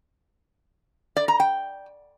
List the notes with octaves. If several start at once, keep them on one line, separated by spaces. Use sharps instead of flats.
D5
A#5
G5